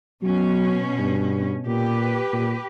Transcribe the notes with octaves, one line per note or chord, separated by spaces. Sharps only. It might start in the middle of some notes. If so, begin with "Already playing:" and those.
B2 F#3 C#4
G2
A#2 G4 B4
A#2